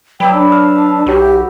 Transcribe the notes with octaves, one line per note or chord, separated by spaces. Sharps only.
F#3 B4 D5 E5 G5
D4
E5 F5
B1 F#4 G4 C#5